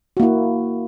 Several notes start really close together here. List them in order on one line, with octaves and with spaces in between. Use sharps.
F#4 A#3 E4